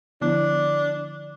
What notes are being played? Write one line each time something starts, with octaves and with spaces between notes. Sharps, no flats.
D3 F3 B3 D4 E4